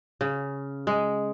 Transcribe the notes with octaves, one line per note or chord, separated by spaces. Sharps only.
C#3
G#3